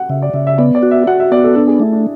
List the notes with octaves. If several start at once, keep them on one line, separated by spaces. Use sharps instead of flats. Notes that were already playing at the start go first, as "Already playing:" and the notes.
Already playing: F#5
C#3 E5
D5
C#3 E5
E5
B3 D5
D5
F#4
E5
F#4 F#5
E5
B3 D5
A4
D4 A4
G#4
A3 E4
D4